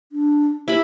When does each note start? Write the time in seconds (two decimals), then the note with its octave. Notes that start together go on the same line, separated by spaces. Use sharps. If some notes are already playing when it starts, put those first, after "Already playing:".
0.12 D4
0.68 E4 G4 B5